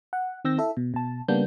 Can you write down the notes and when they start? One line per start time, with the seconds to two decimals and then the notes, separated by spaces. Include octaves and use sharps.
0.13 F#5
0.45 D#3 C4 E6 G6 A#6
0.58 E4 A4 E5
0.77 B2
0.94 B2 A5
1.28 C#3 G3 A#3 B3 D4 G6